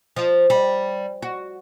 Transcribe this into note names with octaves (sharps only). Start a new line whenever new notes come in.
F3
G3
F#4